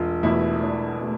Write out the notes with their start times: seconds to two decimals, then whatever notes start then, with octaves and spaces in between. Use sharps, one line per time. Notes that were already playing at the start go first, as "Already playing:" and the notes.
Already playing: E1 F4
0.23 E2 B2 A3 E4
0.62 E1 D4
1.01 B2 A3